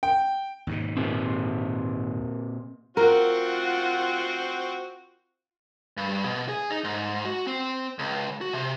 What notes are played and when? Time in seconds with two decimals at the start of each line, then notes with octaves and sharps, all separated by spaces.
0.03 G5
0.67 D#2 G#2 B2
0.97 A#2 C4
2.97 C4 F4 F#4 A#4 F#5
5.97 G2
6.25 B2
6.49 G#4
6.70 D#4
6.84 G#2
7.25 F#4
7.47 C4
7.99 C#2
8.41 F#4
8.53 C3